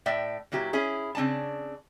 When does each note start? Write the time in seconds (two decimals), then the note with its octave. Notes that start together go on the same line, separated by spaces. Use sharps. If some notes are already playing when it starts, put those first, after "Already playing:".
0.06 A2 D5 E5 G5
0.52 A#2 F#3 E4 G4
0.73 C#4 E4 G#4
1.15 C#3 C4 D4 G#5 A5